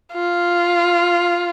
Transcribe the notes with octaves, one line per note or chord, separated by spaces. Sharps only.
F4